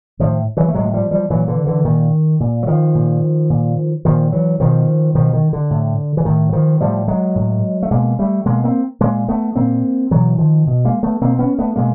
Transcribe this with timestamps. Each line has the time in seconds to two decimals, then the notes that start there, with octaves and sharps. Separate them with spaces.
0.19 A2 D#3 F3
0.57 E3 F#3
0.68 A3
0.74 A2 F#3 G#3
0.85 F#3
0.94 F3 G3
1.11 F3 G3
1.30 A#2 E3 F#3
1.48 D3 E3
1.66 D3 E3
1.85 A#2 D#3
2.40 A#2
2.63 F#3
2.67 D#3 F3
2.95 A#2
3.50 A#2
4.05 A#2 D#3 F3
4.32 E3 F#3
4.60 B2 D#3 F3
5.15 B2 D#3 F3
5.33 D#3
5.53 D3
5.70 A2
6.17 E3
6.25 A2 D#3
6.49 F#3
6.52 D#3 F3
6.81 A2 F3 G3
7.08 F#3 G#3
7.35 A2
7.82 A3
7.91 B2 G#3 A#3
8.19 G3 A3
8.46 B2 G#3 A#3
8.64 A#3 C4
9.00 A#2 G#3 A#3
9.28 A3 B3
9.56 A#2 A#3 C4
10.11 B2 E3 F#3
10.38 D#3 F3
10.67 B2
10.85 G#3 A#3
11.03 A3 B3
11.21 B2 A#3 C4
11.39 B3 C#4
11.59 A3 B3
11.76 B2 G#3 A#3